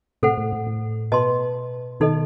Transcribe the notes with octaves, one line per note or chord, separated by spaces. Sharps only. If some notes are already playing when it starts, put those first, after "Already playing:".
A2 C3 A4 C5 F#5
A2
A2
A2
B2 B4 D#5 A5 C6
B2 D#3 D#4 A4 D#5